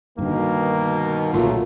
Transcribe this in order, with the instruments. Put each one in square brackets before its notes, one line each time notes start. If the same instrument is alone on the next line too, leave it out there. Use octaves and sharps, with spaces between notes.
[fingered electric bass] G2 D3 [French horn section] B2 D#3 [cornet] A#3
[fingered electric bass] B1 A#2 [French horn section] C#3 F#3 A#3 [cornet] A3 [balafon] F4